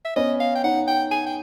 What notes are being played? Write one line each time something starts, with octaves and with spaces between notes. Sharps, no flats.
E5
B3 C#4 D#5
F5
G5
C#4 D#4 F#5
G5
G#5
G5